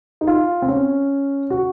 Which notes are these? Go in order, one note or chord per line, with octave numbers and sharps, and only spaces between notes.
D#4
F4
C4
C#4
F#4